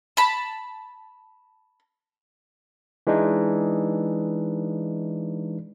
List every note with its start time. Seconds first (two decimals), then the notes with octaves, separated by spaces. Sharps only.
0.17 A5 B5
3.07 E3 G#3 D4 D#4